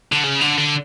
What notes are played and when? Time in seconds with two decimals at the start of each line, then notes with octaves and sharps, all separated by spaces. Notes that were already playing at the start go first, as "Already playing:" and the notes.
0.12 D3
0.23 C#3
0.41 D3
0.58 D3